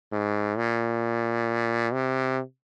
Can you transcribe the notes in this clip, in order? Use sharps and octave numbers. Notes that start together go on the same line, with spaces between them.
G#2
A#2
C3